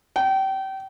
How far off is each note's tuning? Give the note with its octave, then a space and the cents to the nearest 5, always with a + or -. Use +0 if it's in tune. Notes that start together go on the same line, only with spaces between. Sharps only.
G5 -30